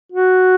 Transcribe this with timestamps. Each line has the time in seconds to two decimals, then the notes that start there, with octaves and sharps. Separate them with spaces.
0.12 F#4